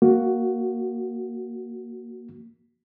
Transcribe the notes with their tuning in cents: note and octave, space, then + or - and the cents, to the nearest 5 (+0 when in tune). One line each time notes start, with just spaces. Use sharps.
A#3 +0 F#4 +5